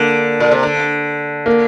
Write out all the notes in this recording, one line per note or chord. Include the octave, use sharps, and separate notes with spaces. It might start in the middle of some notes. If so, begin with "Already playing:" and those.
Already playing: D3 A#3
A#2
C3
D3
A#3